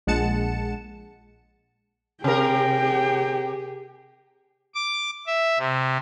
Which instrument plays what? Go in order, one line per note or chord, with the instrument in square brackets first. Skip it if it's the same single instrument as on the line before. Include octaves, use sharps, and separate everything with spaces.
[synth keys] A#1 G#3 F#5 A5 C#7 E7
[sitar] C3 A#4 [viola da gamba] G4 G#4 [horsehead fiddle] G5
[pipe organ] D6
E5
C3